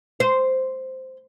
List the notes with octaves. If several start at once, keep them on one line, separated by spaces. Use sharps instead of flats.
C5